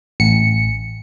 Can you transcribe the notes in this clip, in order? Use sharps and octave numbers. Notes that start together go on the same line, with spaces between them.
A1 C#7